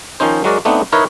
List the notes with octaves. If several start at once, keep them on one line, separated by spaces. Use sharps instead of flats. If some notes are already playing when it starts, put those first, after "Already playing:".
D#3 F3 C#4 D#4 C5
F#3 G#3 F#4 A#4 D5
A3 B3 C4 D4 D#4
D#4 E4 A#4 B4 C#5 D#5